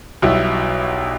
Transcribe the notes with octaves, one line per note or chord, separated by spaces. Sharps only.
B1 B2 G3 E4